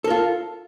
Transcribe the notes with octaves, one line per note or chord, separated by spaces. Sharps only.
F4 A4 A#4